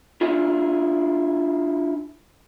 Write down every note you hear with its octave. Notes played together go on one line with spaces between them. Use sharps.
D4 E4 F4 G#4